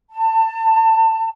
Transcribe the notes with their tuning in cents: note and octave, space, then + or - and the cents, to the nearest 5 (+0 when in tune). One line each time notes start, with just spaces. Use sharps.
A5 +25